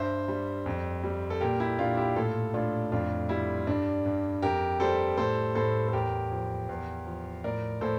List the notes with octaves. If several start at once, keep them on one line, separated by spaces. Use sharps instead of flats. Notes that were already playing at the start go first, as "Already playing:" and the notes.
Already playing: G2 C5 E5
G3
F2
G3
A4
A#2 G4 A#4
E4 G4
A#2 D4 F4
E4 G4
A2 F4 A4
A2 D4 F4
F2 D4 F4
G3 E4
G2 D4
G2
F2 G4 A#4
G3 A4 C5
A2 A4 C5
A2 A4 C5
A4
E2 G4 A#4
F3
E2
F3
A2 A#4 D5
A2 A4 C5